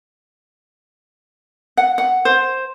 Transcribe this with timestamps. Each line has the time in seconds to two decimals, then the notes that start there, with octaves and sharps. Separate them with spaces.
1.77 F#5
1.98 F#5
2.25 C5